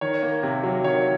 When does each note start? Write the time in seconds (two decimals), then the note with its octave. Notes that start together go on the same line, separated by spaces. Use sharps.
0.01 D#3 C#5
0.23 A#3
0.43 C3
0.64 F#3
0.84 D#3 C#5